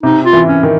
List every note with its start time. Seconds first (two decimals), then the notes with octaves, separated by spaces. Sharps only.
0.03 C3 D#4
0.25 F4
0.33 E3
0.48 C#4
0.63 D#3